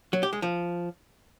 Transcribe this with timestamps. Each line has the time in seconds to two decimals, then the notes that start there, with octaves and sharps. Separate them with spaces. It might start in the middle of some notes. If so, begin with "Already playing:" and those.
0.13 F#3
0.23 G4
0.33 G#3
0.42 F3